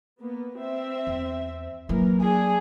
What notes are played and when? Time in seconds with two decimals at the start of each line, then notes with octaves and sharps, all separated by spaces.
0.19 A#3 B3
0.57 C4 E5
1.07 E2
1.89 E3 F#3 A#3 A#4
2.22 D4 G#4 G#5